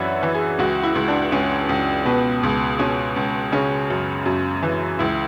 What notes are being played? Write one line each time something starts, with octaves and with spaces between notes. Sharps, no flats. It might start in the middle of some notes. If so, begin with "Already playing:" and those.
Already playing: F#2 E3 B4 C#5 D5 E5 F#5
E3
G#4
C#2 F#4
E4
C#2
D4
C#2 C#4
C#2
B2 B3
C#2
B2 C#4
C#2
C#3 C#4
F#2
F#2
E3
C#2 E4